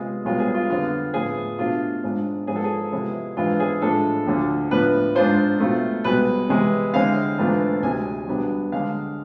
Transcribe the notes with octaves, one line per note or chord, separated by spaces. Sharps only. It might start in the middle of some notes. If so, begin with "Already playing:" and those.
Already playing: C3 G#3 B3 F4
C2 B2 G#3 B3 F4
G#4
F4
F2 D3 F3 B3 F4
A2 F3 B3 F4 G#4
B2 A3 D4 F4
G#2 G#3 D4 F4
G#2 F3 B3 G#4
A4
G#4
C3 F3 G#3 B3 E4
G#2 E3 G#3 D4 F4
G#4
A2 F3 G#3 D4 A4
D2 D3 F3
A2 F3 B3 D4 B4
G#2 G#3 D4 F4 C5
B2 A3 C4 F4
C2 B2 G#3 B4
C3 E3 G#3
D3 G#3 C4 E4 F5
G#2 E3 A3 D4 F4
D2 C3 G#3 G#5
C2 B2 B3 D4
D3 G#3 D4 F5